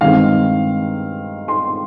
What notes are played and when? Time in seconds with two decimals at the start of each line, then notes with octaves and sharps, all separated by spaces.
0.01 G2 D#3 G#3 C4 F5
1.48 C6